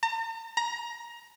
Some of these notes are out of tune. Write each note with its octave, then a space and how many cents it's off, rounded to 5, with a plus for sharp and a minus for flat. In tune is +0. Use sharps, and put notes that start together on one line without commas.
A#5 -45
A#5 +20